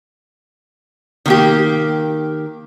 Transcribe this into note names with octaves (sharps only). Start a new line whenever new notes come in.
D#3 A#3 G4